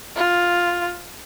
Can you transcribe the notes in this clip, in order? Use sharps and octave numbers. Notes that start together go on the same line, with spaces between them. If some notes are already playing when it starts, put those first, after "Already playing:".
F4